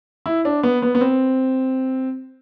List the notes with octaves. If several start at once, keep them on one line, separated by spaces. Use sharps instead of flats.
E4
D4
B3
B3
B3
C4